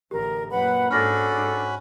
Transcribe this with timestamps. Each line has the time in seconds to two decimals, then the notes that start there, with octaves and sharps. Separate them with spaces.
0.11 A1 D2 G4 A#4
0.50 F#2 A#2 B4 F#5 B5
0.91 G#2 C#4 D4 F#4 A4 B5 F6 A#6
1.34 G#2